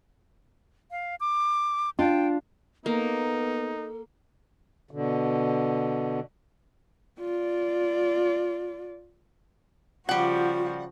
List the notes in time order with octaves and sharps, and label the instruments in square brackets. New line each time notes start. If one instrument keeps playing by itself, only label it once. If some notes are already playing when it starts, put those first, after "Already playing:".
[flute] F5
D6
[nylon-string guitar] D4 F4 [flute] G5
[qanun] A#3 [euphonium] B3 [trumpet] D#4 [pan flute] A4
[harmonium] B2 D3
[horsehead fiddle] F4 D5
[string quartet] C#3 F3 F#4 [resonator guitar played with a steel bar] G3 F#5 [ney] F4